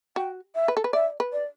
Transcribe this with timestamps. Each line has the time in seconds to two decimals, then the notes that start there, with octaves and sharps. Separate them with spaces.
0.16 F#4 G5
0.55 E5
0.68 B4
0.77 A4
0.84 B4
0.93 D5 E5
1.20 B4
1.33 D5